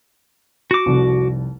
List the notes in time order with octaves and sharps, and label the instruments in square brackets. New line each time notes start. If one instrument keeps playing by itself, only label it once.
[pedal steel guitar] F#4 D6
[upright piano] F1 C2